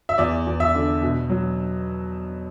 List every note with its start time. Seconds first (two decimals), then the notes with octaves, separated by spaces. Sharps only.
0.09 E5
0.18 E2 D5
0.47 E2
0.60 E5
0.75 D3
1.02 B2
1.30 F#3